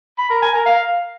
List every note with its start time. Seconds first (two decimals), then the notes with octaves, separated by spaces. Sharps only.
0.18 B5
0.30 A#4
0.42 G#5
0.54 A#4
0.66 F5